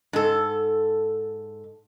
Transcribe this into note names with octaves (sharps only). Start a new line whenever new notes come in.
G#2 A4